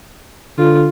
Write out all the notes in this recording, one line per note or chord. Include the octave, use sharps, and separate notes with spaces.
D3 F4